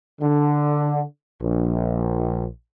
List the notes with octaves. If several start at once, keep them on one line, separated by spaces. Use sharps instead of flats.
D3
A#1